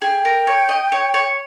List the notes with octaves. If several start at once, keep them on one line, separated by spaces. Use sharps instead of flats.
G#4 G5
A#4
C#5
D#5
C#5
C#5